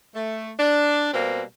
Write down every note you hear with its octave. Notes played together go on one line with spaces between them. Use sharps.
A3
D4
B2 G3 A#3 C4